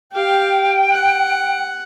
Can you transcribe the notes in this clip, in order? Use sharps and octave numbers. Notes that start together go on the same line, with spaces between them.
G4 F5 G5
F#5